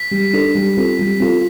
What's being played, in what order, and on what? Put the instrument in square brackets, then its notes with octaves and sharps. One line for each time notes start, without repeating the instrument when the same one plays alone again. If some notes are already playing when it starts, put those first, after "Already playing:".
Already playing: [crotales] B6
[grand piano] G3
D4 A4
G3
C4 F4 A4
G3
C4 F4 A4